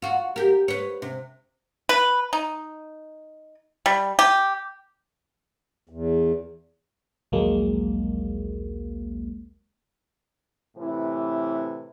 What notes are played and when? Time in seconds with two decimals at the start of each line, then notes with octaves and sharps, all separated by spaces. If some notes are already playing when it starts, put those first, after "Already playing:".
0.02 F4 F#4
0.36 G4 A#4
0.68 B4 C#5
1.02 C3
1.89 B4
2.33 D#4
3.86 G3
4.19 G4
5.89 E2
7.32 A#1 D#2 F#3 G#3 A#3
10.77 A2 C3 E3 E4